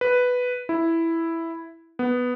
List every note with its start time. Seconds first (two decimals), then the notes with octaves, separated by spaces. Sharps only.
0.01 B4
0.69 E4
1.99 B3